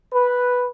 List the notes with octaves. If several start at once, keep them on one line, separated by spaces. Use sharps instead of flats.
B4